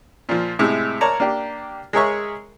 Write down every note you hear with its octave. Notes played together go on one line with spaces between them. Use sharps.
A#2 F3
A2 C3 G#3
A#4 C#5 D5 A5 A#5
A#3 D4 G4
G#3 G#4 A#4 C#5 E5 C#6